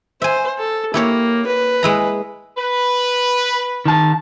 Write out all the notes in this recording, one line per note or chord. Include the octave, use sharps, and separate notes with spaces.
C5 E5 G#5
A4
A#3 E4 G4 C#5
B4
G#3 E4 A#5
B4
D#3 A5